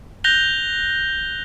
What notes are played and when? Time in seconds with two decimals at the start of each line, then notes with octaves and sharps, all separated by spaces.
0.24 F#6 G6 A#6 F7 G7